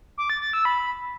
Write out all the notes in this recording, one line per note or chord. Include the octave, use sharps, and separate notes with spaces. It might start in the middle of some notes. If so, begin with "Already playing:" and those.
D6
A6
A6
E6
B5